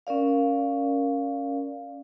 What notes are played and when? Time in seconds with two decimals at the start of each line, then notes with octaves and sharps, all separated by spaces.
0.07 C#4 A#4 D5 F5